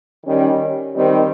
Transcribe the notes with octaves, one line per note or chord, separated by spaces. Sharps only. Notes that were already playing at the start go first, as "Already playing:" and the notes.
D#3 G3 C#4
D#3 G3 C4